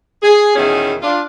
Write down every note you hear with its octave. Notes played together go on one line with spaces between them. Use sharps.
G#4
E2 B2 D#3 C#4 E4 G#4
D4 F4